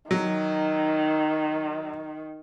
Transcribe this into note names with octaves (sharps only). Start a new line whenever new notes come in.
D#3 F#3